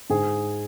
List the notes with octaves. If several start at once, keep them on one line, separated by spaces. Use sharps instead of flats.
G#2 G#4